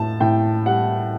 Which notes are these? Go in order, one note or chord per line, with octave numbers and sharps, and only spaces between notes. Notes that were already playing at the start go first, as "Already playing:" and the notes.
Already playing: A2 A5
A2 G5
G3 F#5